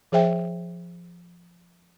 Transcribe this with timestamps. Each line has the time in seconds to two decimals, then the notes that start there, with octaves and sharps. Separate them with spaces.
0.12 F3 G#4 C5 E5 G5